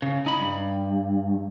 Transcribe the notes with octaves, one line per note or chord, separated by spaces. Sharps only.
C#3
D#4 B5
G2